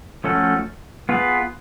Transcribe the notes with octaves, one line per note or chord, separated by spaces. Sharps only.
F3 A3 C#4 F#4 A4
B3 F4 G#4 B4